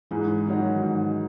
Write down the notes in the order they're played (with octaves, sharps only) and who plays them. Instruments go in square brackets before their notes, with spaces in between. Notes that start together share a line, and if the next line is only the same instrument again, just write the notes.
[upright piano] G#2 [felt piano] E3 G#3
[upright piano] D#3 F#3 C#4 F#4
G#2